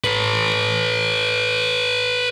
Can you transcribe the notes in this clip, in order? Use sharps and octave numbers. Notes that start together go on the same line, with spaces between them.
A4 B4